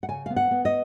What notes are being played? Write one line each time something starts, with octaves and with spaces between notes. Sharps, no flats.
F#5
C#3 G#5
B3 F5
F#5
B3
D#5